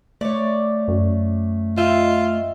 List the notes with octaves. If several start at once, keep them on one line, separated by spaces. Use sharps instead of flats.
A3 C#5 D5
F#2
F4 D#5 E5 G5